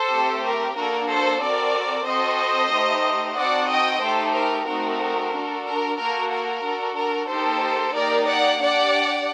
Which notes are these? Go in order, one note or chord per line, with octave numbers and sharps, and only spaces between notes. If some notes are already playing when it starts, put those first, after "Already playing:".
Already playing: A4 C5
A3 C4 G4
A#4
A#3 D4 F#4 A4 A#4
A4 C5
C4 F#4 A4 A#4 D5
C4 F#4 A4 C5 D#5
A3 D#4 G4
C4 D#4 F#4 A4 D5 F#5
D#5 G5
A3 D#4 G4 A4 C5
A#4
A3 C4 D#4 F#4 A#4
D4 F#4 A4
A#4
A#3 F#4 A4 A#4
A#4
D4 F#4 A4
A#4
A#3 D#4 G4 A4 C5
A#3 D#4 G4 A#4 D5
D5 F#5
D4 G4 D5 F#5